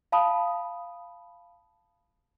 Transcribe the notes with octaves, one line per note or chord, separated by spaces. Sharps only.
F5 A5 B5 D#6